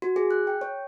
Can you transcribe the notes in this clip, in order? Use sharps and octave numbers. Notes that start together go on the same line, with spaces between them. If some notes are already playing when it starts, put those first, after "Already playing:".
F#4
G#4
F#6
G5
C#5